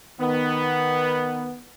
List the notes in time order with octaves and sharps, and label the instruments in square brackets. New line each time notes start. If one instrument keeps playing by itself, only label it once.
[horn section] D#3 B3